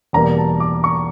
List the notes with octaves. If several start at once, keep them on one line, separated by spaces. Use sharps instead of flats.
E2 B2 G3 A#3 A#5
A5
D6
C#6